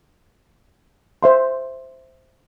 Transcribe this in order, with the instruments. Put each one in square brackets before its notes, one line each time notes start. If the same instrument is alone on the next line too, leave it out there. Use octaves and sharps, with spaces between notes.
[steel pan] C5 E5 C6